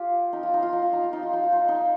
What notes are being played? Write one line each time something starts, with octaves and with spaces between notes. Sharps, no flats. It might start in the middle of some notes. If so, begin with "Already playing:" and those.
Already playing: F4 G4
D#4
F4
D#4
F4
D#4
F4
D#4
F4
D#4
F4
D#4
F4
D#4
D#4